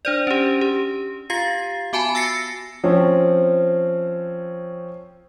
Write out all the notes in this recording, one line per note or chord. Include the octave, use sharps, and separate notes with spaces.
D4 C5 D5
C#4 G4
G4
F4 G4 F5 A6 C7
B3 F#4 G#5 A5 B5
E6 A6 A#6 C7 C#7
F3 C4 C#4